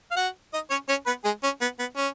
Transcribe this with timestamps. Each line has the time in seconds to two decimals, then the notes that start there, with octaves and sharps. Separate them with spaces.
0.12 F5
0.17 F#4 F#5
0.54 D#4 D#5
0.70 C#4 C#5
0.89 C#4 C#5
1.06 B3 B4
1.24 G#3 G#4
1.43 C#4
1.61 B3
1.79 B3
1.96 C#4